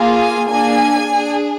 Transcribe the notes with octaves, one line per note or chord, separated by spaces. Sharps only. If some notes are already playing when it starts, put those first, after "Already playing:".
Already playing: A#3 F4 G#4
G#5
A#3 D4 G#4 G#5
D4 G#4